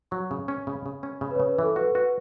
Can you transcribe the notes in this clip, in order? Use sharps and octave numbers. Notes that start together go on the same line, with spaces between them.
F#3 C#6
C#3
C#4
C#3 B5
C#3
C#4
C#3 B5
B4
C#3 C#5
B4
E3 A4
F#4 B4
F#4 B4